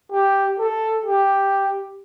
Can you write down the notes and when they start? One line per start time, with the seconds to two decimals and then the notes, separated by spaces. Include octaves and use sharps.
0.12 G4
0.59 A4
1.06 G4